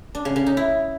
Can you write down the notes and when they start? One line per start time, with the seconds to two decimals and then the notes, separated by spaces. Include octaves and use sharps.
0.15 D4
0.25 C#3
0.36 C#3
0.46 D#4
0.57 E4